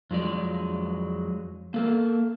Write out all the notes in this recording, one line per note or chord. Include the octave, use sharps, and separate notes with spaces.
F2 F#3 G#3 D5
A#3 A4 A#4